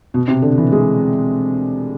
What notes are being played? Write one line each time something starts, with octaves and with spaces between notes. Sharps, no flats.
B2
C3
D3
E3
G#3